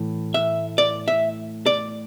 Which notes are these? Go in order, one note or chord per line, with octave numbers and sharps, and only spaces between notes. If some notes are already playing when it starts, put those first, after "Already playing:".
Already playing: A2 E3
E5
D5
E5
D5